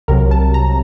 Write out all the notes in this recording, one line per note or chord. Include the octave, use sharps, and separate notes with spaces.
C2 C3 F#3 A#4
A5
A#5